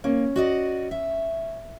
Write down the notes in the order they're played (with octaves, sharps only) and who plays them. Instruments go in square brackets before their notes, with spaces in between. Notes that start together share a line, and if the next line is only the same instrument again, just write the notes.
[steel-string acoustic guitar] A#3 [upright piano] C#4
[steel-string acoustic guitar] F#4 D5 D#5
E5